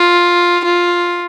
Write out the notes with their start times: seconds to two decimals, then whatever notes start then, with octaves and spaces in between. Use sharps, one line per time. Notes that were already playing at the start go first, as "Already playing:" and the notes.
Already playing: F4
0.65 F4